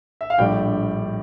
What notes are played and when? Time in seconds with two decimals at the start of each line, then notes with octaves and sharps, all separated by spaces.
0.21 E5
0.30 F5
0.38 A#1 A2 G3 D4 G5